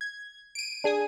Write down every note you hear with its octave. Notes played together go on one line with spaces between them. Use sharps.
G#6
D7 D#7
D4 G#4 G#5 D#6